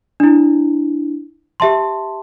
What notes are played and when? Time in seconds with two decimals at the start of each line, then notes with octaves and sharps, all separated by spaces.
0.20 D4 E4
1.60 G4 E5 A5 C6